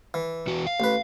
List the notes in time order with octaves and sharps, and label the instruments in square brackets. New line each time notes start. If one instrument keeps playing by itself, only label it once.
[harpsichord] E3
[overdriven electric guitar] E2 F#4
F5
[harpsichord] A1 B4